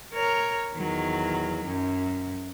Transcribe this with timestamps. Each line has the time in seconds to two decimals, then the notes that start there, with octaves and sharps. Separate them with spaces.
0.13 A#4 C#5
0.75 E2 D#3 F#3
1.64 F#2